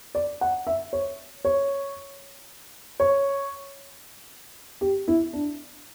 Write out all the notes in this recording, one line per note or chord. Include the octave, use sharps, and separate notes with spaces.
D5
F#5
E5
C#5
C#5
C#5
G4
E4
D4